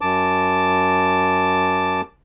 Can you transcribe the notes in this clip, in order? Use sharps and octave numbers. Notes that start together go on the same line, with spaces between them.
F#2 A5 D6